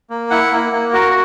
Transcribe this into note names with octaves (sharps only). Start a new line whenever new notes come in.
A#3
E4 F#5
A#3
A#3
F#4 A#4